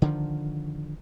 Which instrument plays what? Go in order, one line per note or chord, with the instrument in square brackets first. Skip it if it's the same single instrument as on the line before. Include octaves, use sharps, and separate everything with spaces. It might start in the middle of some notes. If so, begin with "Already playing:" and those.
[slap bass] D3 D#3 F3